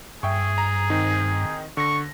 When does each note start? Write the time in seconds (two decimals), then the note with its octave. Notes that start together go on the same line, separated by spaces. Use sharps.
0.23 G2 G#4 E5 G5 C#6
0.58 A#5
0.90 D#3 C4 D#4
1.77 D3 C#6 A#6